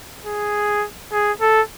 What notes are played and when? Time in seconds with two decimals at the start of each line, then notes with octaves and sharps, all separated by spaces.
0.25 G#4
1.12 G#4
1.41 A4